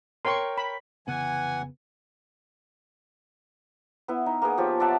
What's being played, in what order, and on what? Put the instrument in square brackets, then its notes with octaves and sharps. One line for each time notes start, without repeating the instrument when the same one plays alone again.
[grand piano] A#4 C#5 G5 [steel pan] C6 C#6
[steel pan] B5
[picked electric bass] F1 C#3 B3 [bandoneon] E3 F#5 [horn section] G#5
[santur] B3 E4
D#4
A#3 B3 G#4
F3 G4 C#5
D5 E5 F#5 A5